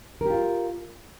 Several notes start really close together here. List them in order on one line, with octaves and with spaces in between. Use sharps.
A#4 G4 F4